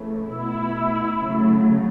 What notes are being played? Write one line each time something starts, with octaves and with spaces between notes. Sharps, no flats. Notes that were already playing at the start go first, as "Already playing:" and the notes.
Already playing: C#3 E3 A3
B2 A3 E4
C#3 F#3 A3